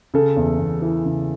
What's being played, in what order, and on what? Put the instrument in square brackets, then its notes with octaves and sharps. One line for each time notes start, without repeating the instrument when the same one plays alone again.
[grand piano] C#3 A4
E2
E2
E3
C#3